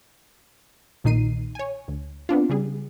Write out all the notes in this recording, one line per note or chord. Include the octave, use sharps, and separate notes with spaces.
B1 A#2 D#3 D#4 C7 D#7
C#5 G#5
D2
B3 C4 D4 F4
C#3 G3 G#4